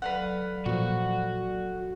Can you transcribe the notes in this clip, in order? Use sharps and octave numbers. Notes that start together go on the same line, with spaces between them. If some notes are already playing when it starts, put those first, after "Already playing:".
F#3 A4 B4 D5 F5 F#5
A#2 F3 F#4